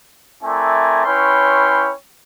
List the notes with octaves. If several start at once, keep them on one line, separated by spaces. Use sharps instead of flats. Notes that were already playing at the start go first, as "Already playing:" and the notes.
A3 C4 E4 A#4 D5 G#5
C#4 E4 B4 C#5 G5 C6